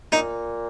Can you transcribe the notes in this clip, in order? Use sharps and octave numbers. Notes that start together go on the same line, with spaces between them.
A#2 D#4